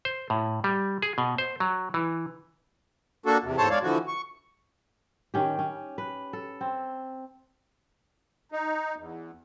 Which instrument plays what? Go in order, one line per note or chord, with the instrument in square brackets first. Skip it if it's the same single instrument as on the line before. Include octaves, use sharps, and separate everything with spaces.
[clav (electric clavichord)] C5
A2
G3
G#4
B2
C5
F#3
E3
[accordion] A#3 D4 F#4 A4
E2 C3
E2 G#2 A4 C5 C#5 A5
G#3 C#5 D5 F5
D3 E3 F3 F#4
C#6
[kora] D#3 C#4 G4
C#4
B4
A4
C4
[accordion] D#4
E2